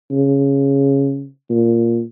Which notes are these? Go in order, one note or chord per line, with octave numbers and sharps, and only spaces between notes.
C#3
A#2